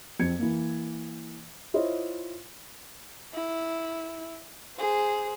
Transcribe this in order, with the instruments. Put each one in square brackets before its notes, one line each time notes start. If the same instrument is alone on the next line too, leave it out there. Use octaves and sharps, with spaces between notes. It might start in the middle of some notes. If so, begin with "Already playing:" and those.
[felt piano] F2 C4 G#6 C#7
E3 A#3
E4 F4 C5 C#5 D#5 E5
[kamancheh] E4
G#4 C5